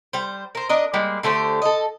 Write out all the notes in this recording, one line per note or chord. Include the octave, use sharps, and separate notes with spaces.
G3 C5
A#4 C5
D4 A#4 D#5
G3 G#3 A#3
D3 A3 G4 C5
A4 D#5